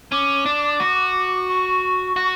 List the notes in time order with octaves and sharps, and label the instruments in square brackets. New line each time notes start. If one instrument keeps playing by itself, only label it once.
[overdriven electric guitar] C#4 [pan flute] D6
[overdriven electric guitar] D4
F#4
[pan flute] C#6
[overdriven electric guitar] F#4